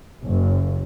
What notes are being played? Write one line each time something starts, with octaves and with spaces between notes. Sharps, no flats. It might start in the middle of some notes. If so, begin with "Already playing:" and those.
F#1